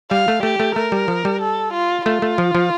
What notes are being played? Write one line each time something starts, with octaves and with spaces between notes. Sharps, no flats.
G3 F5
A3
A3 G4
A3
A3 A#4
G3
F3
G3
A4
F4
A3 F4
A3
F3
F3